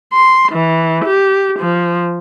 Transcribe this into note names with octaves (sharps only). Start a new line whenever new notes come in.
C6
E3
G4
F3